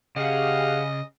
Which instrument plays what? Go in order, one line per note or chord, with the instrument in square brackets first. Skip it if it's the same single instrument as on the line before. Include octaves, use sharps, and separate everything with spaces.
[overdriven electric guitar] C#3 [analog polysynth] G4 G#4 F#5 [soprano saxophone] D#5 [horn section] F5